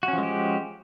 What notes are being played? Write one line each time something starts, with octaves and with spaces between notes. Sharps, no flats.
F3 G#3 C#4 F#4 G4